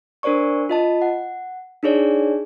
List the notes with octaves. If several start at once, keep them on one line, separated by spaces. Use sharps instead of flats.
D4 A#4 C5 D5 C#6
F4 D#5 A5
F#5
D4 D#4 G#4 C#5 D5